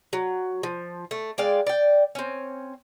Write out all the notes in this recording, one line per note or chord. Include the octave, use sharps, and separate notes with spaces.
F#3
F3
A3
G#3 D5 F5 G5
D5 G5
C4 C#4